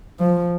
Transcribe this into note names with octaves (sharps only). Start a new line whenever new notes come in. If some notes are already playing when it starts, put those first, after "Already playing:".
F3